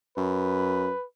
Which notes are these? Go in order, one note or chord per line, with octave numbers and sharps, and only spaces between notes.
F#2 B4